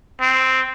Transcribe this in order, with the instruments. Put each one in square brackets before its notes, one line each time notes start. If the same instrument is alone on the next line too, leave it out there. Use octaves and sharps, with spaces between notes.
[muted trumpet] C4